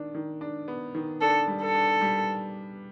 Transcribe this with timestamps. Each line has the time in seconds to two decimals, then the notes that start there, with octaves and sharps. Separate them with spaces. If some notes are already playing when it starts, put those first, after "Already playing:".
Already playing: D#3 D4
0.15 D#3
0.41 D4
0.68 B3
0.95 D#3
1.21 D4 A4
1.48 G3
1.62 A4
1.74 D4
2.01 G3